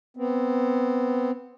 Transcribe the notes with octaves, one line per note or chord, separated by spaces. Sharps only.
B3 C4